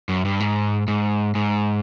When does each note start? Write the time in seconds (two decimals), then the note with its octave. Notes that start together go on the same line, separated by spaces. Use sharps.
0.09 F#2
0.25 G2
0.40 G#2
0.88 G#2
1.35 G#2